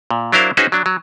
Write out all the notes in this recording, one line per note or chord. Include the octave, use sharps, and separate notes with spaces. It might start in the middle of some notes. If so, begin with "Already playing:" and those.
A#2
F#3 D4 E4 A#4 C5 F5
C#4 D#4 F#4 G#4 B4 C5
F#3 D4
F#3